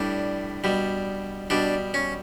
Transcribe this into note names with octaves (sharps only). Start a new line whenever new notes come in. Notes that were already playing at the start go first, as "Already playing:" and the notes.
Already playing: A2 G3 D4
B2 G3
B2 G3 D4
C#4